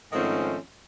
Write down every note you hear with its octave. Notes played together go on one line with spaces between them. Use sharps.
G#2 D#3 F3 A3 C4 C#4